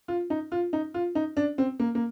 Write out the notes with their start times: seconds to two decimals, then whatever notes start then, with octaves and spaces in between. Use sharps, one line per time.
0.08 F4
0.30 D#4
0.52 F4
0.73 D#4
0.94 F4
1.15 D#4
1.37 D4
1.58 C4
1.80 A#3
1.95 A#3